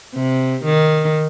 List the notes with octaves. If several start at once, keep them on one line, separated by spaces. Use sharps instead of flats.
C3
D#3